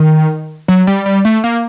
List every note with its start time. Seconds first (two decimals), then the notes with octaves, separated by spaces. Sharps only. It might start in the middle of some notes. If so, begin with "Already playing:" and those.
Already playing: D#3
0.68 F#3
0.87 G3
1.06 G3
1.25 A3
1.44 A#3